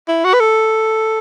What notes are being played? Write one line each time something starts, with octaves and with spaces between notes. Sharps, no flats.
E4
F#4
B4
A4